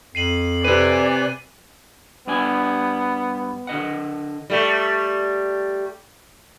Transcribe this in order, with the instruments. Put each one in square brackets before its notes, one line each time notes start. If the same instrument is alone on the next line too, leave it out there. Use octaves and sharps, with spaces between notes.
[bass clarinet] F2 [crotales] C7 D#7 F#7
[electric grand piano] C3 B4 [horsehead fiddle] D5 G#5 [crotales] D#7
[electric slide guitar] G2 D4 G#5 [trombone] B3
[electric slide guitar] D3 D#5 F#5
[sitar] G3 A3